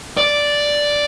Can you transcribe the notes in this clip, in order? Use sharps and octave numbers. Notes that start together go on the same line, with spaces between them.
D5